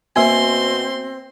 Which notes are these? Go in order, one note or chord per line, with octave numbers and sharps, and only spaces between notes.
B2 A#3 C4 E5 G#5 C6